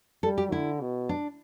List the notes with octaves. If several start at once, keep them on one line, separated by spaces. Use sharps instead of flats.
G3 A4
G4
D3 E4
B2
D4